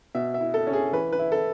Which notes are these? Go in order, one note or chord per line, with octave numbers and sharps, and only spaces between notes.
B2 E5
E5
E4
A4
C#4
G#4
E3 B4
B4
E4
A4